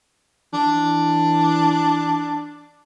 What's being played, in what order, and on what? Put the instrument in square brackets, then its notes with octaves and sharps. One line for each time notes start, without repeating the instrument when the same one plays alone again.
[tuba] E3 [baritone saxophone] D4